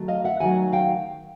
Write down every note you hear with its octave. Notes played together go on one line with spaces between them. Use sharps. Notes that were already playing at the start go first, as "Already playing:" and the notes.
Already playing: D#3 F#3 A3
D#5 F5
E5 F#5
D#3 F#3 A3 F#5 G#5
F5 G5